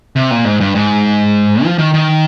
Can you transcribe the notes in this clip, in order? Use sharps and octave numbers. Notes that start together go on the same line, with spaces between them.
C3
A#2
G#2
G2
G#2
F3
D#3
D#3